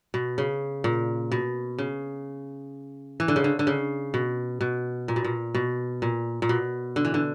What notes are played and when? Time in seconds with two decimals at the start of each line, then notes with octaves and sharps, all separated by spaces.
0.14 B2
0.38 C#3
0.84 A#2
1.32 B2
1.79 C#3
3.20 E3
3.28 D3
3.36 C#3
3.44 D3
3.59 D3
3.67 C#3
4.14 B2
4.61 B2
5.08 A#2
5.16 B2
5.24 A#2
5.55 B2
6.02 A#2
6.42 A#2
6.49 B2
6.96 D3
7.05 E3
7.14 D3